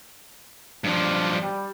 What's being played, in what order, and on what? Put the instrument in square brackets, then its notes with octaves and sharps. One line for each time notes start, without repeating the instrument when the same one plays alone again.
[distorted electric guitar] G2 F3 [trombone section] D4
[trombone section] G3